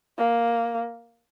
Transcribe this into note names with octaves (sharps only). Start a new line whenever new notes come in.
A#3